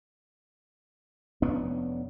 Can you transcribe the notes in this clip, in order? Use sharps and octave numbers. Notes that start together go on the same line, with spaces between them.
F1 B3 C#4 D4